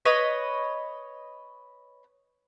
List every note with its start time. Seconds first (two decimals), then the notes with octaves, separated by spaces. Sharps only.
0.05 B4 C#5 D#5